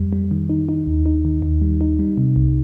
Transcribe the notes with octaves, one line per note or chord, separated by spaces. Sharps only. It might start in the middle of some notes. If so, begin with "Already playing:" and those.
Already playing: F2 G3
G3
D#3
D#4
D#4
D#2
D#4
D#3
D#2
G3
D#4
G3
C3
C2